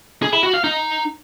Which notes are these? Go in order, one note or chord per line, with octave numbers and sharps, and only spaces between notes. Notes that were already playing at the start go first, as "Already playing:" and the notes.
G#4
E4
F#4
F5
D#4